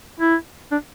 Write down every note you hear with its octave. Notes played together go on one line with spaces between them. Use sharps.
E4
D4